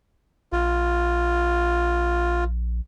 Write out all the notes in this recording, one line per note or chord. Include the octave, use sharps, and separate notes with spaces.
A#1 F4